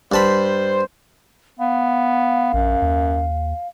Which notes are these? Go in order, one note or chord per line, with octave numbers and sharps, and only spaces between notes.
G2 C5 A5 B5
B3 F5
A#1 F#2
D#2